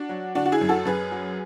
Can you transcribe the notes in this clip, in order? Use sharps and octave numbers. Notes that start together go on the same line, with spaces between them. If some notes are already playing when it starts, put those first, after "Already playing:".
Already playing: D4 F#4
F#3
D3 D4 F#4
F#4
E4 G#4
F#2
F#4 A4
F#2 G#4 B4
F#3